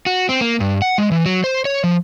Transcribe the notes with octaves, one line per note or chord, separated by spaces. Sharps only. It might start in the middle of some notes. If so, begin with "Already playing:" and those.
F#4
C4
A#3
G2
F#5
G#3
E3
F#3
C5
C#5
F3